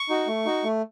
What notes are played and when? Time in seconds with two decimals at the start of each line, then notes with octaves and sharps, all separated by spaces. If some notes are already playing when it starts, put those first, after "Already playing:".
Already playing: C#6
0.09 D#4 F#4
0.28 A3
0.46 D#4 F#4
0.64 A3